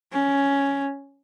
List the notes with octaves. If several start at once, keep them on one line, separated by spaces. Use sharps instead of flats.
C#4